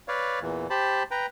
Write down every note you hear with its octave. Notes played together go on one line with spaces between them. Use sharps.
B4 C#5 D5 F5
E2 A#2 E3
G4 C5 A5 B5
B4 G5 A#5